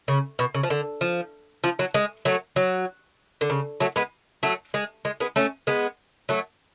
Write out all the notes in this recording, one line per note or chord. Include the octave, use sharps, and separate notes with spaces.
C#3
B2
C#3
F3
D3
F3
F3
F#3
G#3
F#3 A3
F#3
D3
C#3
F#3 A3
G#3 B3
F#3 A3
G#3
G#3
G#3 B3
A3 C#4
G#3 B3
F#3 A3